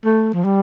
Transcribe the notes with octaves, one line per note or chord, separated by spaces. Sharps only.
A3
F3
G3